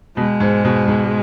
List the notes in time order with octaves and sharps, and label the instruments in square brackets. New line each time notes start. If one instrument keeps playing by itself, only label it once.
[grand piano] B2 [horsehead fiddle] G#3
[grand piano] G#2
B2
G#2